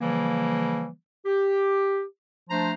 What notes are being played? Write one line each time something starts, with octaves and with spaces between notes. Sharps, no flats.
C#3 E3 F3 G3 A#3
G4
F3 A3 D4 C5 A#5